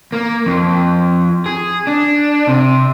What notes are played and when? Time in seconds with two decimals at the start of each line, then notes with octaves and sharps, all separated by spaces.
0.12 A#3
0.46 F2
1.46 G#4
1.87 D4
2.47 C3